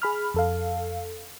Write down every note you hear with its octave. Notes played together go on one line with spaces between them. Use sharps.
G#4 B5 F6
F2 A4 F5